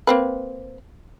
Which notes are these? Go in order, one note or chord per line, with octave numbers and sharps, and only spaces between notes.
A#3 C4 B4